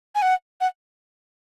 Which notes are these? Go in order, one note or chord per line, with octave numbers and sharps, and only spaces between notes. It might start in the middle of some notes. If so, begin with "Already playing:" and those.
G#5
F#5
F#5